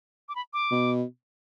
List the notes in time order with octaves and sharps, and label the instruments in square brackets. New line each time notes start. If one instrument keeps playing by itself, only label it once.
[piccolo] D6
B5
D6
[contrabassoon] B2